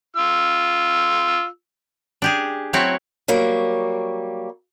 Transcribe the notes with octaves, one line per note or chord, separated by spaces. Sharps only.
F4 E6
D4 G4 G#4
F#3 A3 C4 E4 F#4 C#5
F#3 G3 A#3 C#5